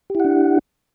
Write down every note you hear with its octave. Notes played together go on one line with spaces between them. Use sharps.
D4 E4 G4 F#5